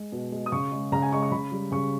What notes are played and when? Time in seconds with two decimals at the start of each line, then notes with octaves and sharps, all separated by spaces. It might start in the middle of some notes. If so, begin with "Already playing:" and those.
Already playing: G#3
0.12 B2
0.32 G#3
0.46 D#6
0.52 C#3 C#6
0.72 G#3
0.92 C#3 A#5
1.02 G#5
1.12 G#3 C#6
1.22 C#6
1.32 C#3 B5
1.52 G3
1.72 C#3 C#6